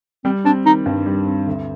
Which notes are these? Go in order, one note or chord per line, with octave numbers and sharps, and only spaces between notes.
G3 C4
C4 D4
D#3 D#4
G2
G3
C4
D2